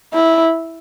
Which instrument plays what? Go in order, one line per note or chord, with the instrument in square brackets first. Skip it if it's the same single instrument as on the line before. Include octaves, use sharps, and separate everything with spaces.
[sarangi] E4